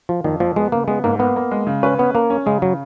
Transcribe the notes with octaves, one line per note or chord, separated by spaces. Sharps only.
F3 F4
F2 D#3
F2 F3
G#3 B3
C#3 A#3
G#3 B3
G#2 A#3
A#3 B3
A#3
G#3
C#3
C#4 B4
B3 C#4
A#3 A#4
C#4
C#3 G#3
C#3 F#3